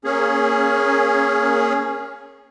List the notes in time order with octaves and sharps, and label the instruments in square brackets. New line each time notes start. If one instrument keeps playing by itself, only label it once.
[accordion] A#3 C#4 G#4